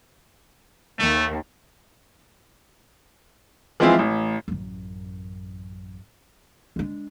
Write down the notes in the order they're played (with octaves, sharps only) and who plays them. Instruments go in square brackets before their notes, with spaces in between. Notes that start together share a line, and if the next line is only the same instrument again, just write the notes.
[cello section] D#2 [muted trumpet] A3
[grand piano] E3 F3 G#3 C4 E4 F4
A1
[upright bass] A1 F#2
G#3 D4